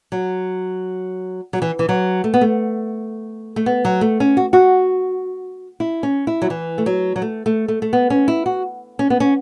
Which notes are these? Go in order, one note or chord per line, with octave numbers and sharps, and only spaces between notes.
F#3
F#3
E3
E3
F#3
A3
B3
A3
A3
B3
F#3
A3
C#4
F#4
F#4
E4
C#4
E4
F#3
E3
A3
F#3
F#3
A3
A3
A3
A3
B3
C#4
E4
F#4
C#4
B3
C#4